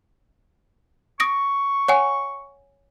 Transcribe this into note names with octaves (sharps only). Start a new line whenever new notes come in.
C#6 D#6 A#6 D7
C#5 F#5 G#5